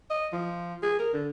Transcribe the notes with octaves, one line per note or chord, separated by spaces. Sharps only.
D#5
F3
G#4
A#4
D3